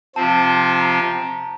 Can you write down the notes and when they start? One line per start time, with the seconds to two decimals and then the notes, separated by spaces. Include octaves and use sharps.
0.16 C3 F3 C4 A5
0.81 A#5